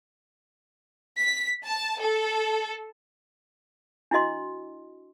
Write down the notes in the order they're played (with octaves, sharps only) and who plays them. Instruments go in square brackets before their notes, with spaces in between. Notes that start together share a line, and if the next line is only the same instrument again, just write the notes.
[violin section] B6
A5
A4
[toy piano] D4 E4 F#4 D#5 C6